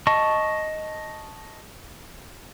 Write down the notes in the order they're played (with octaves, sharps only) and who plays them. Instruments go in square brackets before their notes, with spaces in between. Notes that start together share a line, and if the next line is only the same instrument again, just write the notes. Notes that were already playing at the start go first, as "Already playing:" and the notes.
[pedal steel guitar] D#5 A5 C#6